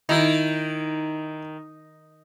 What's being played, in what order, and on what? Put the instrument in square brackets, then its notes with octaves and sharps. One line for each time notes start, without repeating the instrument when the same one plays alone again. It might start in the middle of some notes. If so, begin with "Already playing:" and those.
[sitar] D#3 [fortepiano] D#4 E4